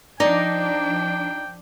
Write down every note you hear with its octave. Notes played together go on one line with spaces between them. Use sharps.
F3 D4 D#4 D5 G5